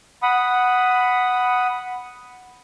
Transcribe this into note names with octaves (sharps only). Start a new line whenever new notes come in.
F#5 B5 D#6